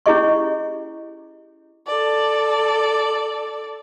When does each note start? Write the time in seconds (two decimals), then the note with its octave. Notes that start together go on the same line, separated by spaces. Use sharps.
0.06 C#4 E4 G4 G#4 D#5 C#6
1.87 A4 D5